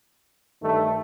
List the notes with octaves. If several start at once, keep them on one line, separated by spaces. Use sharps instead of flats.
G2 D#3 A3